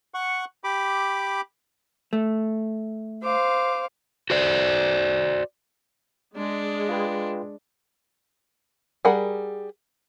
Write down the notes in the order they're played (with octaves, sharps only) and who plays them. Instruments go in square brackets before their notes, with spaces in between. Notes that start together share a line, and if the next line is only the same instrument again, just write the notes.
[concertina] F#5 C#6
G4 B5 D6
[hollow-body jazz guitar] A3
[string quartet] C5 F5 D6
[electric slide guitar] F#4 C5 D5
[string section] G#3 [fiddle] D4
[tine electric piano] F4 B4 G5
[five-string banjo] G3 G#4 A#4 F#5 B5